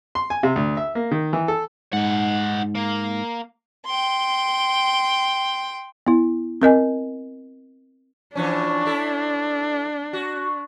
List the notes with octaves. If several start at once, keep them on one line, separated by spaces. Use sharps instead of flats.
C6
G#5
C3
D2
E5
A#3
D#3
E3
A4
G#2 D#4 F#5
A#3
G5 C6
B3 E4
C4 A#4 D#5 G#5
E3 F3 C#4 D4
E4 A4
F#4